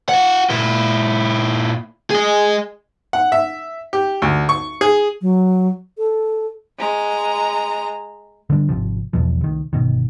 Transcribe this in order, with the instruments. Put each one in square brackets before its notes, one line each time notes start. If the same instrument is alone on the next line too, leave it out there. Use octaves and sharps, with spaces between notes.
[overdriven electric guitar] F4 F#5
A#2 E4
G#4 D#5
[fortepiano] F#5
E5
G4
D2
C#6
G#4
[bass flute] F#3
A4
[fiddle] G#3 A#5
[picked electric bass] D3 G3 D4
G#1 C3 F3
B1 E2 B2 F3
C2 D#3
G1 B2 D#3